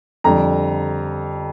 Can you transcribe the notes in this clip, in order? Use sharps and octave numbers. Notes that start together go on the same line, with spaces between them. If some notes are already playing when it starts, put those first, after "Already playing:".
F2 D3 G3 A#5